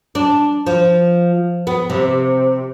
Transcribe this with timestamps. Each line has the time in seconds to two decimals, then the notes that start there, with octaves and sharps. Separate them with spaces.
0.15 D4
0.66 F3
1.67 B3
1.90 C3